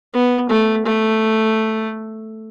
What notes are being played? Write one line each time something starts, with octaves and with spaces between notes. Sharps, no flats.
B3
A3
A3